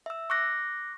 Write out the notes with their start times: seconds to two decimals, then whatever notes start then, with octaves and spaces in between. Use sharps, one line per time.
0.06 E5 E6
0.30 C#6 D6 F#6 A#6